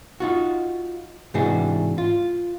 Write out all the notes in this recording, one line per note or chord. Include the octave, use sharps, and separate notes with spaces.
D#4 F4 F#4
G#2 C3 E3 D4 F#4 G#4
F4